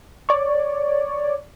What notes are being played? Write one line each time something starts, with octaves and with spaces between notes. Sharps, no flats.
C#5 D5